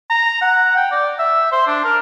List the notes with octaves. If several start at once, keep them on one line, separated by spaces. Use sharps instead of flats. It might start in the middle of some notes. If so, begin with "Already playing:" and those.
A#5
F#5
G5
D5
E5
C5
D4
A#4